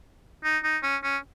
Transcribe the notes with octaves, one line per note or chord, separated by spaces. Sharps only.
D#4
D#4
C#4
C#4